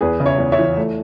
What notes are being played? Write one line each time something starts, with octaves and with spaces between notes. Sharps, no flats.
E2 G#4 B4
C#3
C#5 E5
E2
C#5 E5
E3
A3